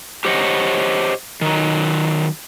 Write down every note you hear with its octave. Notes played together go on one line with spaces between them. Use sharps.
G4 C5 C#5 D#5 F#5
D#3 F#3